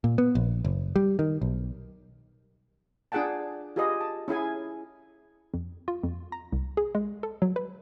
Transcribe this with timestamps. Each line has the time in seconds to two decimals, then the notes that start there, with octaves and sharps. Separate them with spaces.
0.04 A#2
0.18 B3
0.35 A#1
0.65 F#1
0.96 G3
1.19 D#3
1.42 B1
3.12 D4 F4 G#4 F#5 G5 A5
3.76 F4 G4 G#4 B4 D#5 D#6
4.01 A5
4.28 C#4 E4 G#4 G#5
5.54 F2
5.88 F4
6.03 F2
6.32 A#5
6.52 C2
6.77 G#4
6.95 G#3
7.23 A4
7.42 F#3
7.56 B4